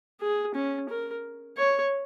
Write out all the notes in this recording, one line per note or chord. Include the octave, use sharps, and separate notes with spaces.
G#4
C#4
A#4
C#5